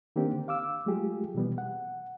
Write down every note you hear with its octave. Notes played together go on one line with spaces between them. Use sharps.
D#3 A#3 C4 D4 G4
D3
F5 D6 E6
F#3 G#3 A3 F4 G4 G#4
B2 E3 G3 B3
F#5